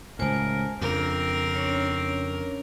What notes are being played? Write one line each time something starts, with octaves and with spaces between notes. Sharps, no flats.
C#2 A2 A#4 C5 G#5 A5
F2 C#3 C4 D4 A#4
C#4 D4 C#5